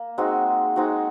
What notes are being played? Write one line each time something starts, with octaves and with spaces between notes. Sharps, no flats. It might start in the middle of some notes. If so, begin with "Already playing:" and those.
Already playing: A#3
G#3 C4 D#4 F#4
G#3 C4 D#4 F#4